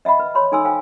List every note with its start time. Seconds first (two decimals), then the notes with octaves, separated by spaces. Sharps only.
0.05 D#5 E5 F#5 B5
0.19 B4
0.35 C#5 B5 C6
0.52 D#4 A4 G#5 C6 E6
0.65 C5 F5 G5 G#5